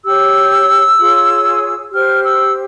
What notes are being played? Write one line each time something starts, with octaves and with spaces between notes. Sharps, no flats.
G4 C#5 E6
F4 G#4 C#5
G4 C5 F6
E6